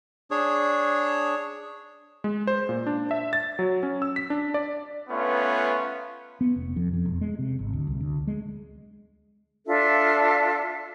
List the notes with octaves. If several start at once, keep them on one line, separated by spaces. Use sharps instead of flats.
D4 G#4 C#5
G#3
C5
A#2
D4
E5
A6
F#3
C#4
E6
B6
D4
D5
A3 B3 C#4 F4 B4
B3
F1
F2
F2
E1
G#3
C3
G#1
D2
C2
D2
G#3
D4 F4 A4 E5